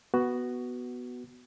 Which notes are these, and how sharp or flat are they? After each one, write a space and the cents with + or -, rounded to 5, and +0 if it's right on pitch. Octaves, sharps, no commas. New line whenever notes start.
B3 +0 F#4 +10